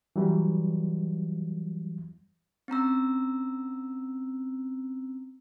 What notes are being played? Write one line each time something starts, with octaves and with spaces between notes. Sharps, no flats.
E3 F#3 G3
C4 C#4 A#5 E6